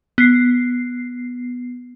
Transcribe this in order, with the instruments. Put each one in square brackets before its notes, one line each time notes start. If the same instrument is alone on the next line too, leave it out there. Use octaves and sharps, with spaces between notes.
[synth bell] B3 C7